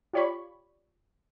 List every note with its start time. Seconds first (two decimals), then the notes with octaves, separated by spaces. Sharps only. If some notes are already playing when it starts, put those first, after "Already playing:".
0.13 F4 G4 C#5 D5 B5 C#6